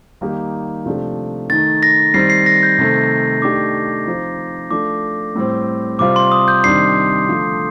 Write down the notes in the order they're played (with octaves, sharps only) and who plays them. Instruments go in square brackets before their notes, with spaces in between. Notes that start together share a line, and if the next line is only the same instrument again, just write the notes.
[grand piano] D#3 G3 A#3 D#4 G4
C3 F3 A3 D4 G4
[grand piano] D#3 A3 D#4 [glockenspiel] A6
[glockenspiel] A#6
[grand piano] D#3 G3 C4 [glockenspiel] C7
[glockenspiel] C7
A#6
G6
[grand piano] C3 D#3 A3
[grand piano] D#3 A3 D4 G4 [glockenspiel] D6
[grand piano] F3 C4 D#4
[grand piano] F3 A3 D4 [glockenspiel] D6
[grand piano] A2 G3 C4
[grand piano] C3 G3 C4 F4 [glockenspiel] D6
[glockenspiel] C6
D#6
G6
[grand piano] C3 D#3 G3 D4 [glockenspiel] C7
[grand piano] D3 F3 A3